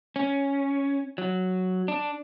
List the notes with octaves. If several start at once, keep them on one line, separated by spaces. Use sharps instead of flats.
C#4
F#3
D4